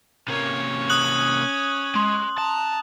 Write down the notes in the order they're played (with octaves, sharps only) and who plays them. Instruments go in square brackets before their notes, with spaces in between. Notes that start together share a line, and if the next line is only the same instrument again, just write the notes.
[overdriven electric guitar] C3 A#3 [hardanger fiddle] C#4 C#5
[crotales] D#6 F#6 F#7
[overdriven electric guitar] G#3 [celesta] C6
[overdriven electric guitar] A5 [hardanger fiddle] A#5